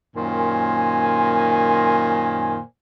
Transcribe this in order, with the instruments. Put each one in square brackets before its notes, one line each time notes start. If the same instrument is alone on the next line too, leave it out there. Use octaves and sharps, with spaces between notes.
[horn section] F#2 A#2 D#3 C5 G#5